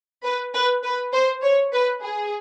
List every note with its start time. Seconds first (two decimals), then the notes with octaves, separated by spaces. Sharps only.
0.23 B4
0.53 B4
0.83 B4
1.13 C5
1.42 C#5
1.72 B4
2.02 G#4